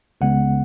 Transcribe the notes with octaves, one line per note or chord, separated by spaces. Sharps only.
C#2 C#3 G#3 B3 F#5